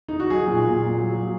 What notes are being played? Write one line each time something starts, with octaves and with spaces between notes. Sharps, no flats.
D#4
F#4
F#3 G#4
A#2
A#2
A#2
F#3
F#3